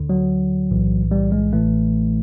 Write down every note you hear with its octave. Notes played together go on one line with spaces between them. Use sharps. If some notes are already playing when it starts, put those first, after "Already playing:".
Already playing: D2 D3
F#3
B1 A2 E3
G3
G#3
A1 A2 E3 A3